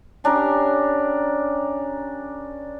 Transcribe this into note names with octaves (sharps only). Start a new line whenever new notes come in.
C#4 D4 G4 A#4